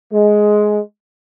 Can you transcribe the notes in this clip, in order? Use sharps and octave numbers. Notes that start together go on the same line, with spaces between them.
G#3